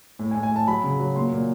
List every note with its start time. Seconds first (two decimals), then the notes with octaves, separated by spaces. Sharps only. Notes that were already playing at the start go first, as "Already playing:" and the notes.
0.19 A2
0.31 G#5
0.36 A2
0.43 G#5
0.51 A2 A5
0.67 F#3 B5
0.84 C#3
1.00 F#3
1.16 A#2 C6
1.32 A#2